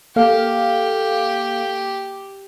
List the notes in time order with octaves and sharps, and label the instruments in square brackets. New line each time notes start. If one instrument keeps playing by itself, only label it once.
[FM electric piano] A#3 A4 F5 [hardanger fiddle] G4